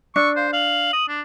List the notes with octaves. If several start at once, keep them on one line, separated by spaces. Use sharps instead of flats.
D4 C#6 E6
C5 F5
F5 F#7
D#6
D4